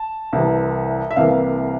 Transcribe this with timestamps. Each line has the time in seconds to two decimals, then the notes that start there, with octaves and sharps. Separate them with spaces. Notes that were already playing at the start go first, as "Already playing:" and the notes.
Already playing: A5
0.33 C2 C3 E3
1.11 E5
1.16 C2 C3 E3 A#3 F5